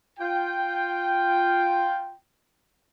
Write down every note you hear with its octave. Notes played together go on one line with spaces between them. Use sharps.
F4 G5